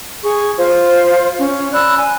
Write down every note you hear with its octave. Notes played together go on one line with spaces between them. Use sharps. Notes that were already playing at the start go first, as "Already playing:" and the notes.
G#4 C#6
F4 C5
C#4
D5 B5 E6 F#6
G#5